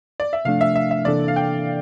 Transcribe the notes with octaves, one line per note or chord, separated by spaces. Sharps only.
D5
E5
C3 F3 A3 D4 F5
E5
E5
E5
C3 E3 A#3 D4 A4 D5
F5
G5